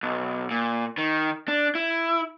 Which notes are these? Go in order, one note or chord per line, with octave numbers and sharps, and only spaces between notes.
B1
A#2
D#3
D4
E4